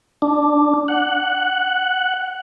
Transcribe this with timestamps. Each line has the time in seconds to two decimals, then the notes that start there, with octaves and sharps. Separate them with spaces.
0.22 D4
0.88 F#5